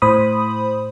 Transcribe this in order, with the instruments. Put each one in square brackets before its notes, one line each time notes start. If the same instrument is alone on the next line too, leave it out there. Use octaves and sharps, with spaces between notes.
[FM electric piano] A2 C5 B5 D#6